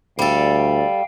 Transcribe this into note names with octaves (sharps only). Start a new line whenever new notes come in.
D2 G3 A4 F5 G5